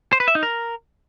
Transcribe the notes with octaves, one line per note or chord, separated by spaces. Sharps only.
C5
B4
E5
D#4
A#4